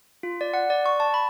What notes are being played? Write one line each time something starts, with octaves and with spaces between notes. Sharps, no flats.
F4
D5
F#5
D5
C#6
A5
B5